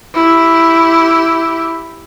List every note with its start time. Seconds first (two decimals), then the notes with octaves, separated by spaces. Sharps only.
0.15 E4 G4